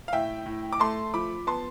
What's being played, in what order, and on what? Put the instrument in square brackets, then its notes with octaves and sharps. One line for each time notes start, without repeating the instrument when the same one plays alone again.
[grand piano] F5
A2 E5 G5
A2
D6
A3 A5 C6
F3 B5 D6
B3 A5 C6